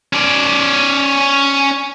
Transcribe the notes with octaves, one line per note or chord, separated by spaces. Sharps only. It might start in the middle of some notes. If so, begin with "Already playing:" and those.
C#4 D5